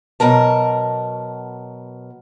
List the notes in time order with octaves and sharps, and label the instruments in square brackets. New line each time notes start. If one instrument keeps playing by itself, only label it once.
[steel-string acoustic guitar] B2 F#3 A#4 A5